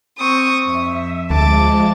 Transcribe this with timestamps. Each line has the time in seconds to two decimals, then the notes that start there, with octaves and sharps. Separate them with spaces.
0.19 C4 C#6 D#6
0.66 F2 E5
1.30 D2 F3 G#3 A5 D6